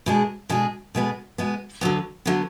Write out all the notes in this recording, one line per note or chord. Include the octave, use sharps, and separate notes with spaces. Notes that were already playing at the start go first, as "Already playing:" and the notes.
B2 G#3 D4 G#4
B2 G#3 D4 G#4
B2 G#3 B3
B2 G#3 B3
D2 D3 F#3 B3
D3 F#3 B3